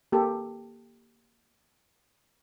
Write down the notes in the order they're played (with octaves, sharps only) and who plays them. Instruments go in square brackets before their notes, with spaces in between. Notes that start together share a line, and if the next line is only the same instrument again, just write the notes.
[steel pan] A#3 G4 A4